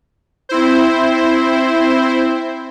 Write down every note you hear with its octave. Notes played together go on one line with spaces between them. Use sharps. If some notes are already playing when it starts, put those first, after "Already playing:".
C4 E4 C5